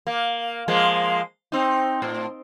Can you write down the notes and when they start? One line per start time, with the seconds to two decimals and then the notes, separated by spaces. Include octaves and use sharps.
0.07 A#3
0.68 F3 G#3 A#3
1.52 C4 D#4
2.02 A2